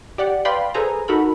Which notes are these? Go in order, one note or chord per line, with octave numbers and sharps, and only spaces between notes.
G4 D5 F#5
B4 D5 F5 G5 B5 C6
G#4 A4 B4 C5 G#5 A#5
D#4 F#4 A4 A#4 B5